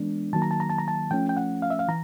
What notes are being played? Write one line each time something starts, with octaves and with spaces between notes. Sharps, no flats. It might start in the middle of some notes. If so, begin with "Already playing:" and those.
Already playing: E3 G#3 B3 D4
D#3 F#3 A#3 A5
A#5
A5
A#5
A5
A#5
A5
F3 A3 C#4 G5
G5
F#5
F5
E5
F5
E3 A#5